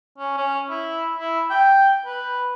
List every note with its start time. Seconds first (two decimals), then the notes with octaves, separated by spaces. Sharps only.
0.18 C#4
0.37 C#4
0.70 E4
1.19 E4
1.50 G5
2.06 B4